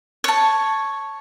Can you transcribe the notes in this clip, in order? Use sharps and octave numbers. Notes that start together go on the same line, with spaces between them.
C#5 A5